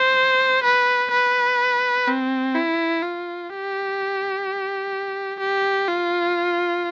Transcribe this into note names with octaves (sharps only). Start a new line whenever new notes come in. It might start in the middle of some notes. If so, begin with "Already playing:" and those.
Already playing: C5
B4
B4
C4
E4
F4
G4
G4
F4